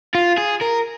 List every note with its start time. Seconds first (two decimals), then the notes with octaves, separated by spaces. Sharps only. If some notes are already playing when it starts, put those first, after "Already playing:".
0.15 F4
0.38 G#4
0.62 A#4